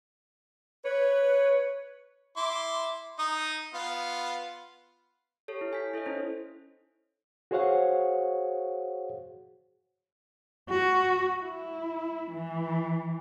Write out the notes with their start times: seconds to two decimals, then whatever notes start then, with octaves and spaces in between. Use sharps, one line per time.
0.84 B4 C#5
2.37 E4 C6 D6
3.19 D#4 D#6
3.74 B3 F4 F5
5.48 G4 A4 C#5
5.61 E4
5.73 G#5 G6 B6
5.93 E4 A4 C#5 D#5
6.06 C#4 D#4 E4 C5
7.51 F#4 G#4 C5 C#5 F5 F#5
10.69 F#4
11.42 E4
12.33 E3